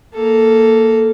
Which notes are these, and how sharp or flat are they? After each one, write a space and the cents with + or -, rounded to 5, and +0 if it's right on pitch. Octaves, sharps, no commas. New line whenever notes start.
A#3 -10 A4 +0